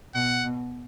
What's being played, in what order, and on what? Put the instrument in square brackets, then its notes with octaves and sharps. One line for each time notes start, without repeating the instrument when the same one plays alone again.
[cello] B2 [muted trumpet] F#5
[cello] B2